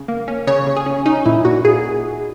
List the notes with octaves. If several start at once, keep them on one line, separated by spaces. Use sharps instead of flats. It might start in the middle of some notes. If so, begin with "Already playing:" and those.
Already playing: C#3
A#3
C#4
C#3 C#5
C#3
G#4
C#4
C#4 D#4
A#2 E4
A#2 F#4
A#2 G#4